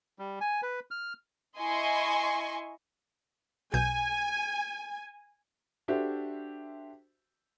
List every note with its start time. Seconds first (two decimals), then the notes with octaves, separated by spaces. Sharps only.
0.19 G3
0.41 G#5
0.63 B4
0.91 F6
1.57 E4 D#5 G#5 C6 C#6
3.74 B1 B2 G#5 G6
5.88 D4 F#4 G4 A4 C5 E5